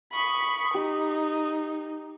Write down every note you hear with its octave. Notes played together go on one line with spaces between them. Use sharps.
B5 C#6 D#6
D#4 G4